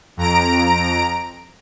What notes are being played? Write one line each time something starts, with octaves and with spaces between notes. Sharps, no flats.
F2 A#5 D7